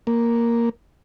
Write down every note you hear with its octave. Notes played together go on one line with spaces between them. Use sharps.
A#3